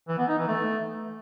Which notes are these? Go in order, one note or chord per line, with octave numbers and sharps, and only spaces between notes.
E3
B3
D#4
E3
A3